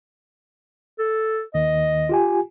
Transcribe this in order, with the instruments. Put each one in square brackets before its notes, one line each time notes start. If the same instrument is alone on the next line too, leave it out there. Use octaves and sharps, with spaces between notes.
[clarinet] A4
[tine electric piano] D#2 D#3 [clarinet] D#5
[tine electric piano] F4 G4 G#5